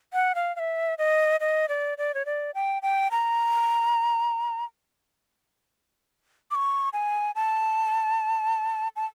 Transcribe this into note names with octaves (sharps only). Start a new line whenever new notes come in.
F#5
F5
F5
E5
D#5
D#5
D5
D5
C#5
D5
G5
G5
A#5
D6
C#6
G#5
A5
A5